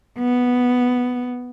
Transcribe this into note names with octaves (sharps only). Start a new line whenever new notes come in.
B3